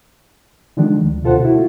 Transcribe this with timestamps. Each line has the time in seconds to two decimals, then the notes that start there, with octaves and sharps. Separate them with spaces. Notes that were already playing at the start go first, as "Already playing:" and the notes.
0.77 D3 D#3 F3 G#3 A3 D4
1.03 D2
1.23 D2 B2 F4 A4 C5 F#5
1.42 E4 F#4
1.55 A3 F4